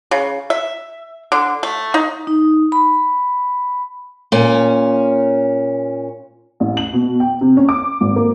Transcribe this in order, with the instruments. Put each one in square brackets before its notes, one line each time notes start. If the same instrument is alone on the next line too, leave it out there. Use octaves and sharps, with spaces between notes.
[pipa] C#3
E5
D3
A3
D#4
[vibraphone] D#4
B5
[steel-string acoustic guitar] A#2 C#4
[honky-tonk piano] A1
F#7
B2
G5
C3
C#4
D6
G#1
A#3